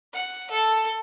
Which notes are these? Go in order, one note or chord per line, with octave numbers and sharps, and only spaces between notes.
F#5
A4